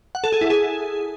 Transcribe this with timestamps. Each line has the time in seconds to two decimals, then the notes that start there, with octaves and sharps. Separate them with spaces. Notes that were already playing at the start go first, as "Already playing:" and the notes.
0.15 F#5
0.24 A4
0.32 G#4
0.41 E4
0.50 G#4